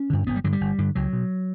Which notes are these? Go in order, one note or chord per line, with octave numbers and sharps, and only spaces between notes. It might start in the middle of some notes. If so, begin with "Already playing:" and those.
Already playing: C#4
G2 D3
G1 B3
G3
G2 D3 F#3
G3
G1
G2 D3
C#2 F#3
B2